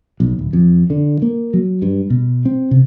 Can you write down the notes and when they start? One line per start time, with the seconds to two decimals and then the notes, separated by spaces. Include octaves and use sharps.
0.20 B1
0.39 D1
0.53 F2
0.90 D3
1.22 A#3
1.54 F#3
1.82 G2
2.10 B2
2.45 C4
2.71 C3